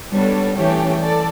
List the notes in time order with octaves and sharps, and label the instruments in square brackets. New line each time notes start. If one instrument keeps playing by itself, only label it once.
[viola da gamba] G3 [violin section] B3 D4 A4 C#5
[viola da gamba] E3 [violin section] A3 C#4 G4 C#5 G5
[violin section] A4 D5